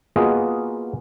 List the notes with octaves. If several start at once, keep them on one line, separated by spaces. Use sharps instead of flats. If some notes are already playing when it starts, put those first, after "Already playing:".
A#3 B3 F4 F#4 G#4 D#5